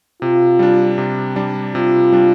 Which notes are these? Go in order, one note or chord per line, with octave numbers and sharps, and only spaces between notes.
C3 F4
G3 D4
C3
G3 D4
C3 F4
G3 D4